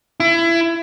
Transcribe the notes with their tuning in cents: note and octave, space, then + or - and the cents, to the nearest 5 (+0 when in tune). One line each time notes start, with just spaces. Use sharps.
E4 +25